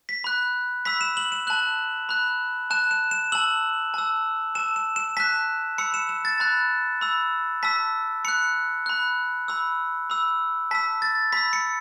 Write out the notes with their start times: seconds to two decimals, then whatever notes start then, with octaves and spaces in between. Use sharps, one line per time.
0.09 B6
0.24 B5 F#6
0.85 B5 E6 B6
1.01 E7
1.17 F#7
1.32 E7
1.47 A5 F#6 F#7
2.09 B5 F#6
2.70 A5 F#6 E7
2.91 E7
3.11 E7
3.32 A5 E6 F#7
3.94 A5 E6
4.55 A5 E6 E7
4.76 E7
4.96 E7
5.17 A5 F#6 B6
5.78 B5 E6 C#7
5.94 E7
6.09 E7
6.25 A6
6.40 B5 F#6
7.01 B5 E6
7.63 A5 E6 B6
8.25 B5 F#6 C#7
8.86 B5 F#6
9.48 B5 E6
10.10 B5 E6
10.71 A5 E6 B6
11.02 A6
11.33 B5 E6 B6
11.53 C#7